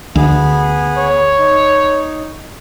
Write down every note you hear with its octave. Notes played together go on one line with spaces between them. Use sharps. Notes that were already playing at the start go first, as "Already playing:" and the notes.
D2 B3 G#4
C#5
D#4